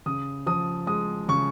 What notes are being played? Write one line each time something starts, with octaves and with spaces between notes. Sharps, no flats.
C#3 D#6
F3 D#6
G#3 D#6
C#3 C#6